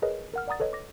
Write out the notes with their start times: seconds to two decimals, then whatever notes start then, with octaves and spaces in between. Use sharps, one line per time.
0.02 G#4 A#4 B4 C#5 D#5
0.34 A#4 F#5 F6
0.48 D5 F#5 A#5 D#6 A6
0.60 A4 B4 C#5 D#5
0.73 D6 A#6